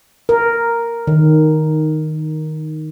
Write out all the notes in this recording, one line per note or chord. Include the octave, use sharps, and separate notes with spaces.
A#4
D#3